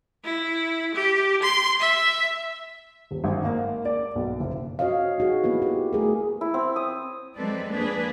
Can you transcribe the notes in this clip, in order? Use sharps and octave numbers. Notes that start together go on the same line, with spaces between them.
E4
G4
C6
E5
D#1
G#1
A#3
D5
B1
F#1
F#4 C#5 D#5 F5
D#4 F#4 G#4
A#3 B3 E4 B4
G4
A3 G#4 A#4
E4
C4
D#6
F#3 G#3 C4 A4 B4 D5
F3 A#3 D4 G#4 B4